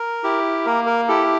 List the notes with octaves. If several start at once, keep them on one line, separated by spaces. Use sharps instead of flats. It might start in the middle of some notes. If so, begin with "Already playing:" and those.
Already playing: A#4
E4 G4
A#3 A#4
A#4
E4 G4 A4